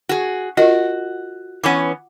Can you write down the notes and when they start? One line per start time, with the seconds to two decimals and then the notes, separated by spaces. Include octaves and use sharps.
0.09 F#4 G#4
0.57 F4 F#4 A#4 D#5
1.64 E3 B3 C#4 F#5 D6